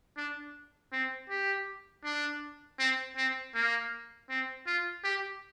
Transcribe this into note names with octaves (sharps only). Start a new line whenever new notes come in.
D4
C4
G4
D4
C4
C4
A#3
C4
F4
G4